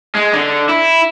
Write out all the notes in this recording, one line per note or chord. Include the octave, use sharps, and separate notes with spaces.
G#3
D3
E4